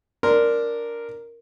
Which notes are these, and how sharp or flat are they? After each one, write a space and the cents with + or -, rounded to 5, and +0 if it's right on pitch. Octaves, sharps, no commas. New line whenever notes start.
D4 +0 A#4 +0 C6 -10